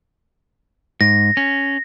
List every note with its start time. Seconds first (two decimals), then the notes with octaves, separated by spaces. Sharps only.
1.01 G#2 A#6
1.37 C#4